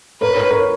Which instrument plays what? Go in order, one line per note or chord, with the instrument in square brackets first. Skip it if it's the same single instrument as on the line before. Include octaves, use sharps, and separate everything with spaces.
[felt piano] A#4 C#5 [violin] B4
[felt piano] A#4 C#5
A#4 C#5